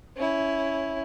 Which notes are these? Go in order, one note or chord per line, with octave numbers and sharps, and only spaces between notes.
C#4 E4